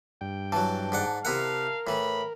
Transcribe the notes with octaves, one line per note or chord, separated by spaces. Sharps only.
G2 G5
E3 F#3 A5
G#2 D5 F#5
C3 E4 A#4 F5 F#5
A2 E3 B5